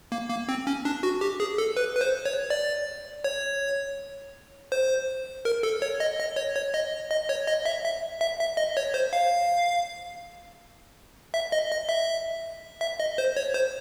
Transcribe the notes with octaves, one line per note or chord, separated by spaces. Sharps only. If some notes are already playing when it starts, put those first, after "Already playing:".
A#3
A#3
C4
C#4
D4
F#4
G4
G#4
A4
B4
B4
C5
C#5
D5
C#5
C5
A#4
A4
C#5
D#5
D#5
C#5
C#5
D#5
D#5
C#5
D#5
E5
E5
E5
E5
D#5
C#5
C5
F5
E5
D#5
D#5
E5
E5
D#5
C5
C#5
C5